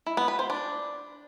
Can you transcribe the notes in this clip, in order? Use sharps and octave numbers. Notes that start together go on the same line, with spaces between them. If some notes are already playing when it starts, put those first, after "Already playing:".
E4
B3
B4
C5
D4